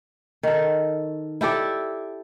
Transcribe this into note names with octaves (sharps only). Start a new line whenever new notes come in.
D#3 A4
E4 G4 A4 D5